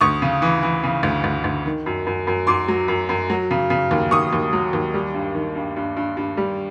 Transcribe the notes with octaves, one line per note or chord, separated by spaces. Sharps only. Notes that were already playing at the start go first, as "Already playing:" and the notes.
D2 C#6 D#6
C#3
E3
E3
C#3
D2
D2
D2
D#3
F#2
F#2
F#2
F#2 C6 D6
F#3
F#2
F#2
F#3
C#3
C#3
D#2
D#2 C#6 D#6
D#2
F#3
D#2
G3
G2
D#3
G2
G2
G2
G2
G3